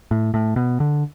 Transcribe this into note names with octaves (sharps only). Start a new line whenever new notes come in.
A2
A2
B2
D3